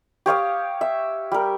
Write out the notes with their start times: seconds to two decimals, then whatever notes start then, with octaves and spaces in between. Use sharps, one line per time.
0.26 G4 C#5 F5 D#6
0.81 E5
1.32 G3 A#4